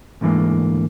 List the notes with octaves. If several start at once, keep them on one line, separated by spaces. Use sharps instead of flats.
D2 G#2 D3 E3 G#3 A#3